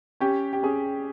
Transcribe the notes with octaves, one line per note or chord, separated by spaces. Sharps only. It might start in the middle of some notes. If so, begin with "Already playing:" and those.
C#4 G4
G4
C#4 G#4